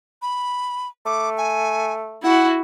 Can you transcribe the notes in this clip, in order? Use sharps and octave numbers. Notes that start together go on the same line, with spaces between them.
B5
A3 D6
G#5
E4 F#4 F#5